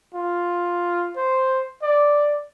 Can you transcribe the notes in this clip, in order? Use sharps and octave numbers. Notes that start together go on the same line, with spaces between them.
F4
C5
D5